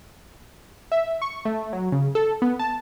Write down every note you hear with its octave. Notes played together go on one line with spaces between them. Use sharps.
E5
C#6
A3
F#3
C#3
A4
B3
A5